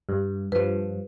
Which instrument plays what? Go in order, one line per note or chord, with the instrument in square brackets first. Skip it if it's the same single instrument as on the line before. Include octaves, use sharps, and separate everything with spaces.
[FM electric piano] G2
[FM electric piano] G2 F3 [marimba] B4